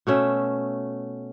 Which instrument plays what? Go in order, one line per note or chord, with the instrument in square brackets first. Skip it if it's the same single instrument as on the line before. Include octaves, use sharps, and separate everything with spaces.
[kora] B2 A3 C#4 E5